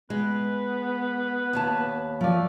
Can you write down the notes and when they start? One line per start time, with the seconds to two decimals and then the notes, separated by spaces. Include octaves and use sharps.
0.10 G#3 B3 B4
1.53 D#2 C#5 A5
2.21 F3 A3 D5